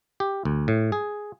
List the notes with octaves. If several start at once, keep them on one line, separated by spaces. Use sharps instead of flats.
G4
D2
A2
G#4